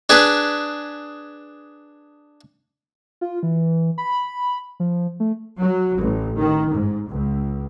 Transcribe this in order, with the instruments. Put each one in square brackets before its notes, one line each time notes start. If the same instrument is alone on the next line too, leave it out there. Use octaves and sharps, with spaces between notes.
[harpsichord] D4 G#4 B4
[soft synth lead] F4
E3
B5
F3
A3
[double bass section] F#3
A1
D#3
G#2
C#2